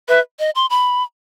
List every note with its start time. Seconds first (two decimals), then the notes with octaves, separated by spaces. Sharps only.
0.08 B4 E5
0.39 D#5
0.55 C6
0.70 B5